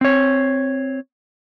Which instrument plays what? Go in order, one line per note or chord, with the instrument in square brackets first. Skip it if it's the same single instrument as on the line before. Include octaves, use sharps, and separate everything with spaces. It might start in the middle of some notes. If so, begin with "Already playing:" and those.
[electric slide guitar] C4 C#5